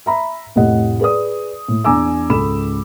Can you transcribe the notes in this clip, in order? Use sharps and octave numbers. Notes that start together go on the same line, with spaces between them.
E5 A#5 B5
F1 A2 G4 D#5 F#5
G#4 B4 D5 D#6
A2
E2 D4 G#5 A#5 D6 E6
C#2 G#2 A4 B5 E7